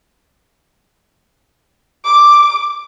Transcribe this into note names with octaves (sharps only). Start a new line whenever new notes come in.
D6